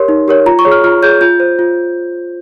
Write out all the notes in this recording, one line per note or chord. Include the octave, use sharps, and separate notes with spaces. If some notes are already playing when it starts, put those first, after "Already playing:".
Already playing: G4 A#4 C#5 C6
D#4
G4 A#4 C#5
F4 A#5
C#6
G#4 C#5
F6
F4 F6
G#4 C#5 G6
F4 G6
C5
F4